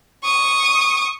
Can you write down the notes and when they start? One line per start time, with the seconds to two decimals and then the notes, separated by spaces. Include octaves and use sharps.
0.24 C#6 D#6